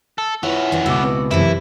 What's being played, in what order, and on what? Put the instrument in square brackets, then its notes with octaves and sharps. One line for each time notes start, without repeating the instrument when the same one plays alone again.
[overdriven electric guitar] A4
[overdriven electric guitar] B3 C#4 [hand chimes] E4 F4 B4 [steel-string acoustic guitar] E5
[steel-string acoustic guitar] E3 D4
[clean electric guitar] C#2 B2 [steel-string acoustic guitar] F#4 [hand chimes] D6 E6
[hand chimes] C4 B4
[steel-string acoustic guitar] F#2 C3 E3 [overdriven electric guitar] E4